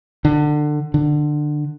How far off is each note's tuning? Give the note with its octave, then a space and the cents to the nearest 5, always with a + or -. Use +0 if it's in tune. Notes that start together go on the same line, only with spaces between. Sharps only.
D3 +25
D3 +20